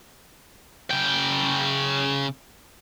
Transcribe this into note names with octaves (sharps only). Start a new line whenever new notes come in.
C#3 G5